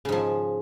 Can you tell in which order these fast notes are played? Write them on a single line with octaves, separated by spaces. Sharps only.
C#3 G#2 F3